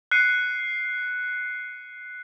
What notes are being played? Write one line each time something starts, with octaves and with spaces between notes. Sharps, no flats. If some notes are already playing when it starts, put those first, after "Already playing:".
F#6 C7 C#7 D#7